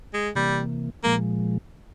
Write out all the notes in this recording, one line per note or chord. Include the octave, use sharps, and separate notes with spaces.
G#3
C3 E3 G3 A#3
A#2 F3 G#3 A#3